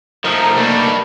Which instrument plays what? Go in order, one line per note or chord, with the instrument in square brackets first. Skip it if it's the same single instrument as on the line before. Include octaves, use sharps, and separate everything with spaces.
[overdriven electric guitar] F3 [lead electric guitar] A3 D#4 [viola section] A#4 A#5
[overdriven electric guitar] G3 D4 [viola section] A#3